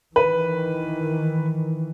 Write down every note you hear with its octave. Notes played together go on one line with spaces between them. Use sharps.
D#3 E3 B4